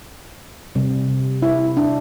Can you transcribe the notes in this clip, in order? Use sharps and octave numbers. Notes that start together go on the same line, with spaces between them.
C3 G3
E4
D4